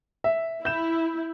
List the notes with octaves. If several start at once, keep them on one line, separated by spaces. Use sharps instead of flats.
E5
E4 G6 E7